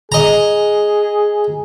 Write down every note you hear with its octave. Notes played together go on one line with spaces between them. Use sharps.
G#4 D#5 A#5